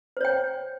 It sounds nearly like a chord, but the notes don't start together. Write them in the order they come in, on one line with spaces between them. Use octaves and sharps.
C5 C#5 G5